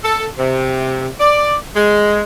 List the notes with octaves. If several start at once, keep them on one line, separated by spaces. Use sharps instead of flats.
A4
C3
D5
G#3